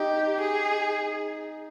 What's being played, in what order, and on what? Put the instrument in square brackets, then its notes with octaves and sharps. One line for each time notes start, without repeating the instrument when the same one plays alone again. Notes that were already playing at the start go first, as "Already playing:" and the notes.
Already playing: [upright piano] D#4 [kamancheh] G4
[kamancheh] G#4